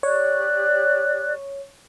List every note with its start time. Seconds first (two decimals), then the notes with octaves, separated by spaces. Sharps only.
0.03 G4 C#5 D5 F#6